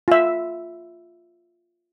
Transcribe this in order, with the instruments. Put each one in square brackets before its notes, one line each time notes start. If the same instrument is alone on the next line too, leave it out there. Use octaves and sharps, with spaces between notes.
[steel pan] F4 E5